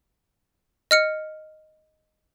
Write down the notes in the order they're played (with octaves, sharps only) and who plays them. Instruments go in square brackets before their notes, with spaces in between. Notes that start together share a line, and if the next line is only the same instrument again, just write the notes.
[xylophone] D#5 F6 C#7